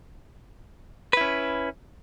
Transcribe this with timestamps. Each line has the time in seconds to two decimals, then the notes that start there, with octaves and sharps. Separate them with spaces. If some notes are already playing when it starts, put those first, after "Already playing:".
1.13 B4
1.17 E4
1.21 C#4